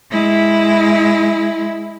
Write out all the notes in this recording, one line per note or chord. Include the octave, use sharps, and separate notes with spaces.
G#3 E4